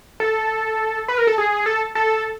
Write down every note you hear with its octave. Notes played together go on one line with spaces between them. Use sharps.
A4
B4
A#4
A4
G#4
A4
A4